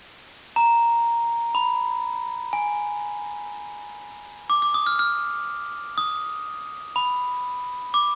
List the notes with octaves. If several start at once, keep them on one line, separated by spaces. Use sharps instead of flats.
A#5
B5
G#5
D6
D6
D#6
F6
F6
D#6
B5
D6